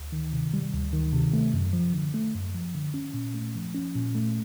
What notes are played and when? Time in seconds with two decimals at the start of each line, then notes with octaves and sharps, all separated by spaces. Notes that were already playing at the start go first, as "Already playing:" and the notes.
Already playing: D2
0.12 D#3
0.33 C3
0.54 G3
0.73 D2
0.93 D#3
1.13 C3
1.33 A3
1.54 F#2
1.73 F3
1.94 D3
2.14 A3
2.35 F#2
2.54 F3
2.75 D3
2.94 C#4
3.14 A#2
3.34 A3
3.55 F3
3.74 C#4
3.95 A#2
4.15 A3